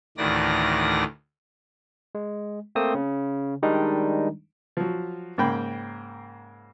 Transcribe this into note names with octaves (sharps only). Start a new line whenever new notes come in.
D2 A2 D#3 E3 D5 A#6
G#3
A3 A#3 C4 C5 D#6
C#3
D#3 G3 G#3 D4 D#4
F3 F#3
G#2 C#3 A#3 G5 B5